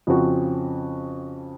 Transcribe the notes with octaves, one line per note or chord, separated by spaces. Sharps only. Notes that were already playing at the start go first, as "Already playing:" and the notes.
F2 C#3 F3 C4 F#4